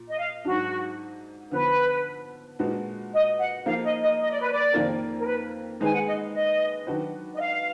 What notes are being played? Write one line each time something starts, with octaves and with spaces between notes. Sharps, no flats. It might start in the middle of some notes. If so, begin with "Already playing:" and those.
Already playing: A#2
D#5
F5
G#2 F#3 D4 F#4
D3 F3 B3 B4
A#2 G#3 D4 F#4 B4
D#5
F#5
F3 A#3 D#4 A#4 F5
D#5
D#5
D#5
D5
B4
D5
F2 D#3 A#3 F4 A#4
A#4
B4
D#3 G#3 D#4 G#4 B4 G#5
F#5
D#5
D#5
D#3 F#3 D4 F#4 B4
D#5
F5